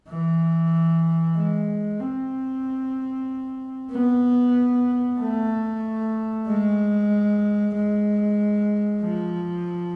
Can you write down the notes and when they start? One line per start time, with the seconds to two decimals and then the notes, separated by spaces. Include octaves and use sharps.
0.08 E3
1.36 G#3
2.00 C4
3.91 B3
5.20 A3
6.47 G#3
7.75 G#3
9.02 F3